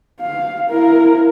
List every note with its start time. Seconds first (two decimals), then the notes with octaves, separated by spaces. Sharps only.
0.20 F5
0.70 E4 A#4